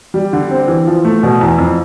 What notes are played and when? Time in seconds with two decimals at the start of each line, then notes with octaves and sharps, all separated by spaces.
0.14 G3
0.33 D3
0.51 C4
0.68 E3
0.87 F3
1.04 A3
1.23 B2
1.41 E2
1.58 F2